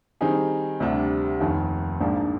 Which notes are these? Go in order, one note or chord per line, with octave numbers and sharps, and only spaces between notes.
D#3 G3 C4 D#4 G#4
D2 C3 G3 D4
F1 D#2 D#3
A#1 G#2 F3 A#3 D4